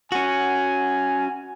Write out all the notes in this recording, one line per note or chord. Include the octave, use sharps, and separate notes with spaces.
C#4 F#4 G#5